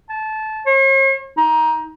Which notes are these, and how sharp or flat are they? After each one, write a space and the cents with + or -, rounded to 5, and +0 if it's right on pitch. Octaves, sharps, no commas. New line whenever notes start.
A5 -20
C#5 -45
D#4 +20